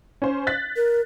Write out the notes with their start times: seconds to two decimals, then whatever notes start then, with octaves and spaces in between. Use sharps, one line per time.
0.22 C#4 C5
0.47 F#6 A6 B6
0.76 A#4